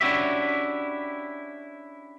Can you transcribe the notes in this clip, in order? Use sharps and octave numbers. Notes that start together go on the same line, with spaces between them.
C#4 D4 E4 F#4 G4 E5